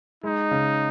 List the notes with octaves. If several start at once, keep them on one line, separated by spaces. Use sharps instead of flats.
G#3 D#4
C#3